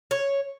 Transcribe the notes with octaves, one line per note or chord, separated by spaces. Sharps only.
C#5